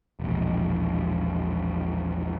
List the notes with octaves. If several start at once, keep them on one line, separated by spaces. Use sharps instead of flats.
E1 A#1